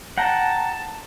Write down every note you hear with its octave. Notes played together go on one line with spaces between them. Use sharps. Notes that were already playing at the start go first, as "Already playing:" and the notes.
F#5 G5 A5 A#5